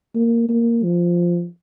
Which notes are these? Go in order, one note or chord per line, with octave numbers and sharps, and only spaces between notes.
A#3
A#3
F3